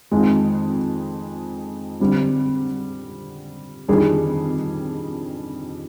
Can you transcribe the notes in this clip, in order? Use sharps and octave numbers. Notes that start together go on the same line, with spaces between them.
F2 D#3 G#3
D3 G3 C4
F2 D#3 G3 D4 G#4